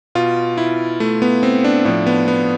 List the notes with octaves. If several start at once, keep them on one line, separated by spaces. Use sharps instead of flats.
B2 F4
E4
A3
B3
C4
D4
A2 F3 D4
B3
B3